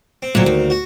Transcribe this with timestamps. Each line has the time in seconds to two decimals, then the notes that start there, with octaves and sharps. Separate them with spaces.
0.22 C4
0.35 D2 A#2 F#3 C4
0.46 D#2
0.70 F#4